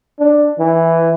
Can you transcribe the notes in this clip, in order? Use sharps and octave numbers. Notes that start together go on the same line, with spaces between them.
D4
E3